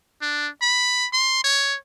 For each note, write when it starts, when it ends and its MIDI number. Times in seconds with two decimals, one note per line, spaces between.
0.21 0.49 62
0.62 1.07 83
1.13 1.43 84
1.44 1.76 73